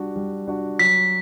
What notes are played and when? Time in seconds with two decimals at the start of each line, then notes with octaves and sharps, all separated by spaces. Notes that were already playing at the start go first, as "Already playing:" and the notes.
Already playing: G3 D4 F#4
0.16 G3
0.48 D4 F#4
0.79 F#3 B6